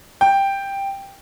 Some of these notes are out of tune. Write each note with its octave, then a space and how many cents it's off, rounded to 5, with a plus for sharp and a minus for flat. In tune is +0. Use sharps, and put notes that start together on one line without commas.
G5 +5